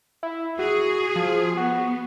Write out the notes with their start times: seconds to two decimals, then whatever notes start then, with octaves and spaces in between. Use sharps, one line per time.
0.23 E4
0.59 F#4 G#4
1.16 F3
1.57 B3 F#4